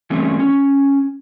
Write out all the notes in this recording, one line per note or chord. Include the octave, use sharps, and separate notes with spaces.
E3 G3 A3 A#3 C4 C#4
C#4